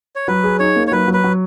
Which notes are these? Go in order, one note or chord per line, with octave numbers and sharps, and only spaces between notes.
C#5
F#3 B4
G#4
D#4 C#5
A#3
C#5
F#3 B4
F#3
B4
F#3